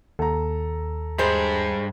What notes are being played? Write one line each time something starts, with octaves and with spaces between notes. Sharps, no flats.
D#2 A4 A#5
G2 G3 G#3 C5